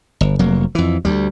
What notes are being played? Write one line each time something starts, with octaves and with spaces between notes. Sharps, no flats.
G1
F1 F#3 A#3
F2 E3
D2 G3